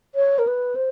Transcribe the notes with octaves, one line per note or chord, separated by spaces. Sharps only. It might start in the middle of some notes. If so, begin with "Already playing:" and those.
C#5
A#4
B4
C5